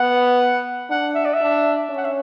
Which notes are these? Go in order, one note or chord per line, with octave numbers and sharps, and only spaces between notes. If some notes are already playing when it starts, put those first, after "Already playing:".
Already playing: B3 F#5
D4 F#5
E5
D5
E5
D4
C#4
F#5
E5